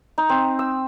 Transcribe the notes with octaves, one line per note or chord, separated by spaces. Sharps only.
D#4
C4
E6